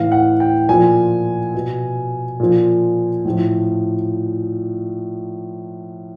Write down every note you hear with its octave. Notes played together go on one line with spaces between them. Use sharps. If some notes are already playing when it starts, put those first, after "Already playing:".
Already playing: A2 E3 F5
F#5
G5
A#2 F3 G#5
B2
A#2 F3
A2
F3